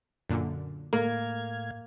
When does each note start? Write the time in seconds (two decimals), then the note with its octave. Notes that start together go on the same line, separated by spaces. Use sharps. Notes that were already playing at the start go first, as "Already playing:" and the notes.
0.30 F#2 A#2 D3
0.93 A2 A#3 F5 G#6